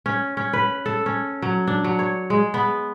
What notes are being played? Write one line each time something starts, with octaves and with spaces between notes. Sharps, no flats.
C#4
C#4
B4
A4
C#4
F#3
D4
F#3
C#5
G#3
B3